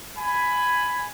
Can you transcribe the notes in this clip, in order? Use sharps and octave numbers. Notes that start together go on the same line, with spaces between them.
G#5 B5